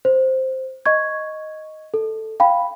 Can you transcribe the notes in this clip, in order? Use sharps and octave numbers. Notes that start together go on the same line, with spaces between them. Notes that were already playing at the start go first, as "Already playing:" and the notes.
C5
D#5 C#6 G#6
A4
F5 G5 B5